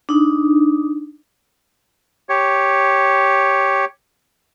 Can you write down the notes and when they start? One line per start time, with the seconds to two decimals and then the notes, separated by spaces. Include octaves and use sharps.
0.09 D4 D#4
2.29 G4 C#5